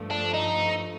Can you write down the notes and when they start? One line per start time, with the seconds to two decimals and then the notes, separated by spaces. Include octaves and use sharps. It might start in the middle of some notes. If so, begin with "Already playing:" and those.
Already playing: G2 F3 A3
0.11 D4
0.34 D#4